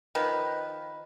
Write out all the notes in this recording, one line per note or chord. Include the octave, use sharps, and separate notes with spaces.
D#3 F3 B4